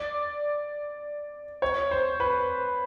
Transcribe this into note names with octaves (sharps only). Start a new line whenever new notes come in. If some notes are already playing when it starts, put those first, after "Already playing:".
Already playing: D5
C#5
C5
B4